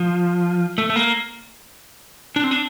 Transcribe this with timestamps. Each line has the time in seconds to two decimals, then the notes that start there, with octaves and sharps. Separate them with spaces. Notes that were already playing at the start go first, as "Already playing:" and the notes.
Already playing: F3
0.78 A3
0.90 A3
0.96 A#3
2.36 D4
2.44 C4
2.51 D4